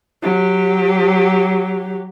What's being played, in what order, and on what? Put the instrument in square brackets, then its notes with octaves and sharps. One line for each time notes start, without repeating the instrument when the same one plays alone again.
[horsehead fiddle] F#3 G4